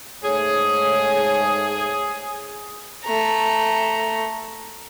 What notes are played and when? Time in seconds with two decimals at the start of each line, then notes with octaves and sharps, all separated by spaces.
0.24 G#2 A3 G#4 C#5
3.05 A3 A#5